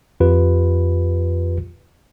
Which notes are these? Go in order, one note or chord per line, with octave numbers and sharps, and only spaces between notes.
F2 F4 G4 B4